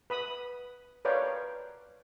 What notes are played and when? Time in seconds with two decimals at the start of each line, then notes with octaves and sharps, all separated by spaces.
0.10 B4 B5 D#6
1.05 A#4 B4 C#5 D5 F5 G5